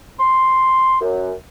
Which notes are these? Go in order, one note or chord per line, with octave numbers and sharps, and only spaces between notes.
C6
F#2